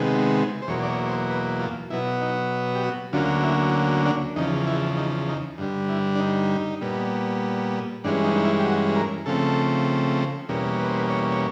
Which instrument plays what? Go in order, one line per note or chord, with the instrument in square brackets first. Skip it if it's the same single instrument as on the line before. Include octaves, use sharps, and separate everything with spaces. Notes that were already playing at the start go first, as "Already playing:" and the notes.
Already playing: [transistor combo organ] C3 D#3 G#3 B3
C5
E2 B2 F#3 A#3 C#5
D5
C#5
C5
B4
F4
B2 F#3 B3 E4
D#4
G4
F#4
D2 D3 F#3 A#3 C#4 F4
E4
D4
E2 C#3 F3 D#4
E4
D#4
D#4
G2 D3 G3
E4
D4
D#4
A#2 G3 B3
G2 E3 G#3 C#4 D4
D#4
D#4
E4
G4
F#4
A#4
C#3 F3 A3 C4 A4
E2 B2 G3 A#3 C#4
B4
C5
B4
C#5
C#5